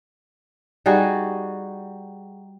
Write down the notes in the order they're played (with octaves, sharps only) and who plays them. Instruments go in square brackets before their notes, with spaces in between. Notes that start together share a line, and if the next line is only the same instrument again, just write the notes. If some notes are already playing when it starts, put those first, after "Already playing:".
[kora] G3 D#4 F#4 G#4